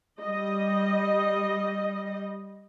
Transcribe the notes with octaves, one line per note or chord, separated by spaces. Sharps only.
G3 D#5